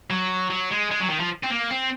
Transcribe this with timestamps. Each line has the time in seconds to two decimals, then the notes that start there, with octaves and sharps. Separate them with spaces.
0.10 F#3
0.50 F#3
0.71 G#3
0.91 G#3
1.01 F#3
1.10 D#3
1.20 F3
1.44 C4
1.50 A#3
1.70 C4